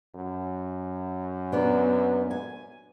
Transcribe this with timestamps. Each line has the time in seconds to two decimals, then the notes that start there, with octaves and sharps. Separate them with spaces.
0.14 F#2
1.52 A#3 B3 D4
2.31 G#5